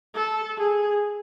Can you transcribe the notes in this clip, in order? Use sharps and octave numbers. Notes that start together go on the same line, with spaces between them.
A4
G#4